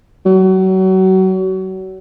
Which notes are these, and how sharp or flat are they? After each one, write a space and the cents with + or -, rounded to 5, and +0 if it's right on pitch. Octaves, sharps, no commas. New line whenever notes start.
F#3 +30